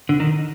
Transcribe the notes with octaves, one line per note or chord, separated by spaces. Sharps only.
D3
D#3